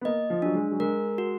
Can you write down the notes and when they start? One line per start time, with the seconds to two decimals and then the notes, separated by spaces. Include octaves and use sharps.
0.01 B3
0.05 A#3 D#5
0.30 F3
0.42 F#3 D4
0.55 G#3
0.71 F#3
0.80 G#3 A#4
1.18 F#4